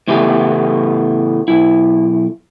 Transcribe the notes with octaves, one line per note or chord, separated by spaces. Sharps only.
A2 C#3 E3 A3 B3 G4
B1 E4